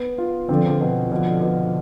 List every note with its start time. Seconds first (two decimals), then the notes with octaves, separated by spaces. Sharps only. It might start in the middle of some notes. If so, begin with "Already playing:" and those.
Already playing: B3
0.18 F4
0.49 D3 F3 C4
0.80 B2
1.12 B2 D3 F3
1.42 B2